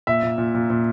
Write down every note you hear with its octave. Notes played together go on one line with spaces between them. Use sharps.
A#2 E5
A#2
A#2
A#2
A#2